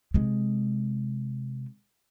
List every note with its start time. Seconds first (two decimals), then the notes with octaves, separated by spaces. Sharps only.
0.14 C3 G#3